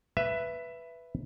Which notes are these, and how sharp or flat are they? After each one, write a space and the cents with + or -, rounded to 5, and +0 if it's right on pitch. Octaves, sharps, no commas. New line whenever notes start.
B4 +0 E5 +15